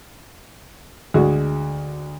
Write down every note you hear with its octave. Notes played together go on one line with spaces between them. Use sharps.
D2 G#3 F#4